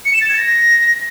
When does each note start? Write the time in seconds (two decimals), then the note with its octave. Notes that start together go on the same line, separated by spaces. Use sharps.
0.05 C#7
0.13 E7
0.21 A6
0.29 G#6
0.37 A#6